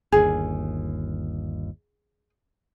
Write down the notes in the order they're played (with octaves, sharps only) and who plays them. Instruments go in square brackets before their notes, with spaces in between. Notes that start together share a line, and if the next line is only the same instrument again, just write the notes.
[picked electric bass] G1 D#2 [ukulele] G#4